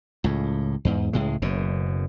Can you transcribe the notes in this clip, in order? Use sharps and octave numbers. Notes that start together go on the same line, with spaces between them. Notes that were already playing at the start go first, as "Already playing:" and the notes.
C#2 A2
E2 G#2
C#2 A2 G#3
F#1 F#2 B2